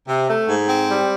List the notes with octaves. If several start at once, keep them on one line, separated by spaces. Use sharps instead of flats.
C3
A3
G#2
C4
G3